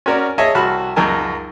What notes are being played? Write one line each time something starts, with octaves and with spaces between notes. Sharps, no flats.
C#4 F#4 A#4 D5
G#4 C#5 D#5 E5 G#5 A5
C2 F#4 A5 B5 F6
C#2 F#2 D#4 A#4 G#5 A5